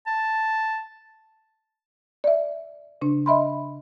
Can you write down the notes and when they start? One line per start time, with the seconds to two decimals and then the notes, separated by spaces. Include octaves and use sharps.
0.07 A5
2.24 D5 E5
3.02 C#3 D4
3.26 D#5 E5 B5 C6